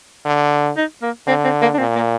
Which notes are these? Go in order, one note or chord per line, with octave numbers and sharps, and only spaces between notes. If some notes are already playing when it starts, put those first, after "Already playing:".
D3
D#4
A#3
D3 C4
C4
A#3
D4
A#2 C4
A#3